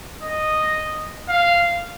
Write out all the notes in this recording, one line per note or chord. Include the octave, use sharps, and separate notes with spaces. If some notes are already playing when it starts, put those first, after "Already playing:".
D#5
F5